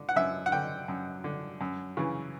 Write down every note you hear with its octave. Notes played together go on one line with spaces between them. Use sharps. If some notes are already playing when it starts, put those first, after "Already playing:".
Already playing: D3
F#5
F#2 E5
F#5
D3 G5
F#2
D3
F#2
C#3 E3